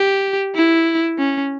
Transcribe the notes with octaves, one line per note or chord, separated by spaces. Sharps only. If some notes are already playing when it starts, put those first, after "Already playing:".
Already playing: G4
E4
C#4